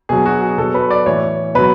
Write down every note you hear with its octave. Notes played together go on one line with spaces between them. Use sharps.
B2 F#3 G#4
F#4
G#4
B2 F#3 A4
B4
D5
A2 E3 C#5
B2 F#3 B4